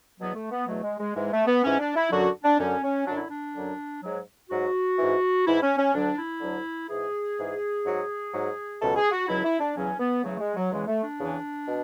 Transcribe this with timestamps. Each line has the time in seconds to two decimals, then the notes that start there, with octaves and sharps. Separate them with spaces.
0.19 E2 B2 F#3 B3
0.35 A3
0.51 B3
0.67 E2 B2 F#3 A3
0.83 G#3
0.99 G#3
1.15 G#2 E3 G#3
1.31 A3
1.46 B3
1.63 G#2 E3 C#4
1.79 D4
1.95 E4
2.11 F#2 D3 F#3 F#4
2.43 D4
2.58 F#2 D3 F#3 C#4
2.83 C#4
3.06 F#2 D3 F#3 D4
3.17 E4
3.29 D4
3.54 F#2 D3 F#3
4.02 G#2 F#3
4.49 G#2 F#3 F#4
4.98 G#2 E3
5.46 G#2 E3 E4
5.62 C#4
5.77 C#4
5.93 D2 D3 F#3 D4
6.17 E4
6.41 D2 D3 F#3
6.89 G#2 E3 G#4
7.36 G#2 E3
7.84 G#2 F#3
8.33 G#2 F#3
8.80 C#2 B2 F#3 A4
8.96 G#4
9.11 F#4
9.28 C#2 B2 F#3 E4
9.44 E4
9.60 D4
9.75 E2 C#3 F#3 C#4
9.99 B3
10.23 E2 C#3 F#3 A3
10.34 A3
10.39 G#3
10.56 F#3
10.71 E2 C#3 E3 G#3
10.87 A3
11.03 D4
11.19 E2 C#3 E3
11.67 B2